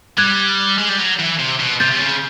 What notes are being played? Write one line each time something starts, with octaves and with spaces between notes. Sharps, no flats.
G3 F#6 G#6
G#3
G3
F#3
E3
C3
B2
C3 G6 A6
C3
C#3